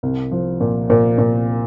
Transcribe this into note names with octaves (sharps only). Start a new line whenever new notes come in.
C2
F3
A#2
A#2
A#2